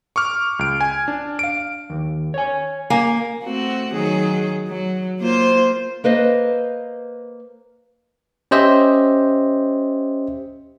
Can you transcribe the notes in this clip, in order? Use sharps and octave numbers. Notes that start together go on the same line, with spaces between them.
C#6 D6 F6
C#2 D7
G#5
D4
F5 D7
D#2
C#5 G#5
A#3 G#5
A3 C4 F#4
D#3 F#3 G#4
F#3
A#3 F4 C5
A#3 B4 C5 D#5
C#4 G4 C5 D#5 E5